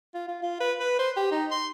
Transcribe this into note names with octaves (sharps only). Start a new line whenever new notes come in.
F4
F4
F4
B4
B4
C5
G4
D#4
C6